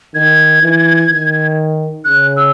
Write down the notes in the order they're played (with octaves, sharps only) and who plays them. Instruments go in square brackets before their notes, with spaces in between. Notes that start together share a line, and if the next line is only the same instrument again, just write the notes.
[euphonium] D#3 [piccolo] G#6
[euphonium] E3
D#3
[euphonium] C#3 [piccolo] F#6
[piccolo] E6